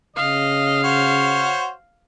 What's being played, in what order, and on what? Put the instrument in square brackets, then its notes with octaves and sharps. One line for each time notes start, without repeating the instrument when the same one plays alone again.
[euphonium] C#3 [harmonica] D#5 [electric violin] F5
[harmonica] F#4 C5 C#5